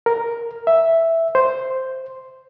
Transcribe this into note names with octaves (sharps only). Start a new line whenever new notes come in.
A#4
E5
C5